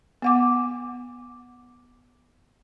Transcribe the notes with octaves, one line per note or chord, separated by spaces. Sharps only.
B3 F#5 D6